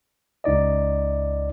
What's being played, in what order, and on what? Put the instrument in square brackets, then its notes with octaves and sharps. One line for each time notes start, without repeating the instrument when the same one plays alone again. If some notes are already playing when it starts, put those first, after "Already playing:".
[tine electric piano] C#2 D#4 D5 D#5